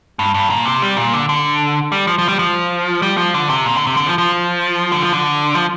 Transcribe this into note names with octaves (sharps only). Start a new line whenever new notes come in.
G2
G2
A#2
C3
G3
A#2
D3
D3
G3
F3
F3
G3
F3
G3
F3
D3
C3
A#2
D3
C3
D3
F3
F3
D3
F3
D3
F3